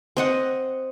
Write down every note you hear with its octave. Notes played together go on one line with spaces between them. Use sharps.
C4 D#5 F#5